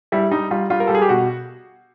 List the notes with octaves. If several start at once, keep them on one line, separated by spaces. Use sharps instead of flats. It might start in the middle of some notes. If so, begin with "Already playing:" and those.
G3 E4
G3 D#4
G3 F4
G3 F4
A#4
G3 A4
G#4
G4
B2 F#4